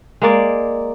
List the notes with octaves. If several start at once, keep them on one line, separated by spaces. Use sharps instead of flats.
G#3 A#3 D5